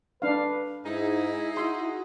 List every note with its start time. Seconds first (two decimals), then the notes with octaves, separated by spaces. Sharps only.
0.22 D4 B4 F5
0.86 G#2 D#4 E4 G#4
1.57 F#4 C6